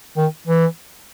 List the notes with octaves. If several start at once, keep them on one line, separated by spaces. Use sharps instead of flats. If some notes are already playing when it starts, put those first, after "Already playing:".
D#3
E3